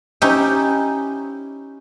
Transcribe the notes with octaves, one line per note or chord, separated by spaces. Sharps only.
C#4 D#4 E4 G4